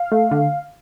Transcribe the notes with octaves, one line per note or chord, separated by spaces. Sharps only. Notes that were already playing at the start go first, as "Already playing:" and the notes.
Already playing: F5
A3
D3